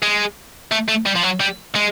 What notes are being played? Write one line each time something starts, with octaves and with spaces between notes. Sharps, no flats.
G#3
A3
A3
G3
F3
F#3
G3
G#3